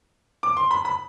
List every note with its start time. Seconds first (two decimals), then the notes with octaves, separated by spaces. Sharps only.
0.43 D6
0.57 C6
0.71 B5
0.85 B5